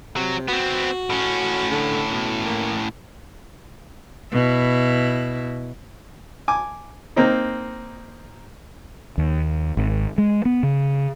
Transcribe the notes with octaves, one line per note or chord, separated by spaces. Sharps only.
C3 F#3
B3 C4 F#4
A2 C#4
D3
B2
A#3
B2 E4
G#5 D6
A#3 C4 D#4
D#2
G#1
G#3
B3
C#3